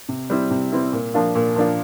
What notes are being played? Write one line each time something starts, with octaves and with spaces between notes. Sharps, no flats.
C3
G3 C4 E4
C3
G3 C4 E4
A#2
F3 A#3 D4 F4
A#2
F3 A#3 D4 F4